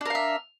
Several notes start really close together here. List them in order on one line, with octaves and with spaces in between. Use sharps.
D4 A#4 F5 E5